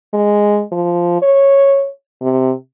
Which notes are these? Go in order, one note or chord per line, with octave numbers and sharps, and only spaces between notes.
G#3
F3
C#5
C3